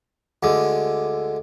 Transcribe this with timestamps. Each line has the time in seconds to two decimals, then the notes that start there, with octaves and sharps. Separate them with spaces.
0.43 D2 D3 G#3